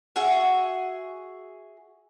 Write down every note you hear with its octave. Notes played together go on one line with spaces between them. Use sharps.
F#4 G#4 E5 F#5